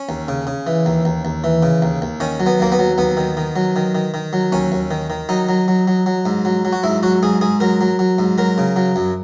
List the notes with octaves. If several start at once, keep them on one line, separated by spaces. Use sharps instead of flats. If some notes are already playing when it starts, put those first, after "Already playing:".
Already playing: C#4
D#2
C#3
C#3
E3
D#2
D#2
D#2
E3
C#3
D#2
D#2
D#3 C#4
F#3
B3
D#2 A#3
B3
F#3
D#2 B3
D#3
D#3
F#3
D#3
D#3
D#3
F#3
D#2 C#4
D#2
D#3
D#3
F#3 D#4
F#3
F#3
F#3
F#3
G#2
F#3
F#3
F#4
G#2 E4
F#3 F#4
G#2 G#4
G#2 G#4
F#3 A#4
F#3
F#3
G#2
F#3 A#4
C#3
F#3
F#2